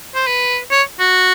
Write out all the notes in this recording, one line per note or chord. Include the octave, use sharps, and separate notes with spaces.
C5
B4
C#5
F#4